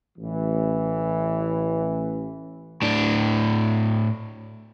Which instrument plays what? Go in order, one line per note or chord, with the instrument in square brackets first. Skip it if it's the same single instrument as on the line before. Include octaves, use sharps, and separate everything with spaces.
[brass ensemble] A1 E3
[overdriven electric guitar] A2 D4